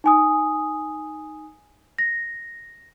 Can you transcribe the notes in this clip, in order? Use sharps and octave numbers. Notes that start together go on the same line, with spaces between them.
D#4 G#5 D#6
A#6